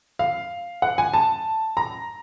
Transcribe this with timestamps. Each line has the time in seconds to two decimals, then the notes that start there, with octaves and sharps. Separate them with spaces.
0.19 F5
0.82 F#5
0.98 G#5
1.14 A5
1.77 A#5